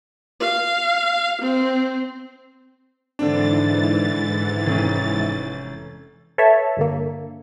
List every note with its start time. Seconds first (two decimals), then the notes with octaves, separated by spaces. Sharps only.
0.40 F5
1.42 C4
3.19 G#2 D3 E3 C4 D4 A6
4.66 F1 C#4
6.38 A4 B4 C#5 E5
6.77 G2 D3 A#3